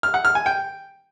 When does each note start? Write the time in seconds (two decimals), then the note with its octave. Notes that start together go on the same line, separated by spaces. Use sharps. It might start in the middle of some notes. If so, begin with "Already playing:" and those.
0.03 F6
0.14 F#5
0.25 F6
0.35 G#5
0.46 G5